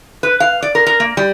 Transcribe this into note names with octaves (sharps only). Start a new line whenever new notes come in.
B4
F5
D5
A#4
A#4
A#3
G3